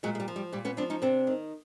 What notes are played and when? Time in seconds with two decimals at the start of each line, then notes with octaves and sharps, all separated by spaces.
0.03 A#2 F#3 G#3
0.15 G#3
0.20 G3
0.28 F3
0.36 G3
0.52 A#2 G3
0.65 B3 C#4
0.77 F3 C4 D4
0.90 C#4 D#4
1.02 C3 C4 D4
1.27 D#3